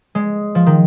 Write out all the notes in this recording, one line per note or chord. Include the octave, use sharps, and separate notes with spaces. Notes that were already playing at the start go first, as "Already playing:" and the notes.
G#3
F3
D#3